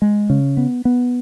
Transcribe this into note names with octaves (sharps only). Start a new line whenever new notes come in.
G#3
C#3
B3
B3